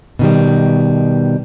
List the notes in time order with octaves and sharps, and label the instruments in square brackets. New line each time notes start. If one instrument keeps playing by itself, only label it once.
[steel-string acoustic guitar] B2 D#3 G3